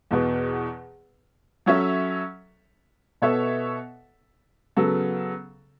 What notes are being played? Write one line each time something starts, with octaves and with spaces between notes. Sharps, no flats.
E2 B2 B3
F#3 C#4 A4 C#5 E5
B2 B3 A4 C#5 E5
C#3 F#3 B3 A4